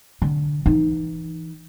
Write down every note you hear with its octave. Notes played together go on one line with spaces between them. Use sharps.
D3
E3 D#4